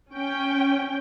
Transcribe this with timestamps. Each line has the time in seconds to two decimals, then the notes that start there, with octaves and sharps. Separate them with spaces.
0.13 C#4 G5